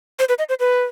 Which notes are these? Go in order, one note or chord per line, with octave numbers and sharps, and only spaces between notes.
C5
B4
D#5
C5
B4